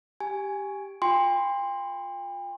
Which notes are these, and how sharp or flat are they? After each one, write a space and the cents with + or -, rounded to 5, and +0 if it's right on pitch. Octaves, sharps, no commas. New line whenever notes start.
G4 +0 G#5 +0
F4 +25 G5 +40 C6 +0